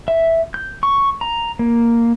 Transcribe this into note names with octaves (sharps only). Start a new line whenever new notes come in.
E5
G6
C#6
A#5
A#3